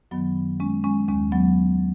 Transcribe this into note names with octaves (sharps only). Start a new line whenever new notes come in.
F#2 D#3 F#3 B3
G#3 C#4
G#3 C#4
D#2 D#3 G#3 C#4
F#3 B3